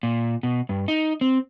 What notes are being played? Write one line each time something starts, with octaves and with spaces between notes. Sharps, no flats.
A#2
B2
G2
D#4
C4